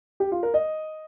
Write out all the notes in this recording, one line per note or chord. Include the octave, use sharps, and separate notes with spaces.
G4
F4
A#4
D#5